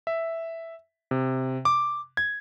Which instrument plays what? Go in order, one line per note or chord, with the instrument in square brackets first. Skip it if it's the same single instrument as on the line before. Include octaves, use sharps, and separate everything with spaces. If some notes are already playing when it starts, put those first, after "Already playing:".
[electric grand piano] E5
C3
D6
G#6